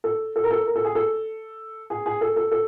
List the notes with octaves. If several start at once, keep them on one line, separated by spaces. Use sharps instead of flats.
A4
A4
A#4
A4
A#4
A4
G#4
A4
G#4
G#4
A4
A4
A4